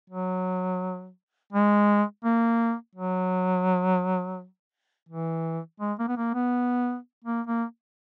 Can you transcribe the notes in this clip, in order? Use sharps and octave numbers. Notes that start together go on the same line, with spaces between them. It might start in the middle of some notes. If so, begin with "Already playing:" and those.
F#3
G#3
A#3
F#3
E3
G#3
A#3
B3
A#3
B3
A#3
A#3